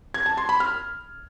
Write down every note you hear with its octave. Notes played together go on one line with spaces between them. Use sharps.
G#6
A5
C6
B5
F6